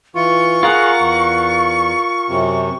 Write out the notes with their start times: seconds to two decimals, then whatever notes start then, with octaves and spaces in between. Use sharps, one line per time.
0.15 E3 F4 C#6
0.63 F4 G#4 A#4 F#5
0.99 E2
2.29 F#2 C3